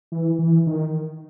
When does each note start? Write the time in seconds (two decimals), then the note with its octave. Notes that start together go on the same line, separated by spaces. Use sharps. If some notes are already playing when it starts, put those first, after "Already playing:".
0.12 E3
0.39 E3
0.67 D#3